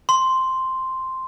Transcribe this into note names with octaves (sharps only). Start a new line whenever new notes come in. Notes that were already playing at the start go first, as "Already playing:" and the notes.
C6